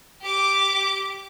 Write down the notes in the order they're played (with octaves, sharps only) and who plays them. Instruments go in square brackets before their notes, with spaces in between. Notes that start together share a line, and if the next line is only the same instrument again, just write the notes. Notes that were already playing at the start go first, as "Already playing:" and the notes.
[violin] G4 D6